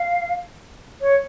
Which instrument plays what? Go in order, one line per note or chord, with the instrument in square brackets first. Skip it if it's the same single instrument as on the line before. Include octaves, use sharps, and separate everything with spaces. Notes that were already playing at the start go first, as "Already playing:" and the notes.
Already playing: [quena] F5
C#5